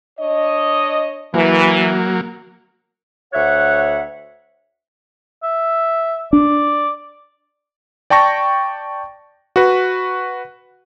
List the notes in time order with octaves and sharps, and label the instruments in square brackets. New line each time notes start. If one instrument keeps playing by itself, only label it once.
[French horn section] D4 C#5 D#5
[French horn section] E3 [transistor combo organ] F#3 A#3
[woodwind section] D2 C#5 E5 F#5
[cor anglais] E5
[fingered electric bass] D4 [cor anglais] D5
[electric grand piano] D5 G5 A5 C#6 A#6
F#4 B4